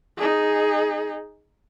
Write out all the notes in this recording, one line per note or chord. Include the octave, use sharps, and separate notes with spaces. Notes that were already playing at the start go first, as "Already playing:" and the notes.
D#4 G#4